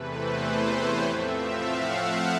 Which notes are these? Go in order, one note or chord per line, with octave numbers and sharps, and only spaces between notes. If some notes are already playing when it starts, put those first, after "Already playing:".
Already playing: E2 C3 E3 A3 B4
C5
C#5
A2 F3 A3 C4 E5
F5
F#5
F5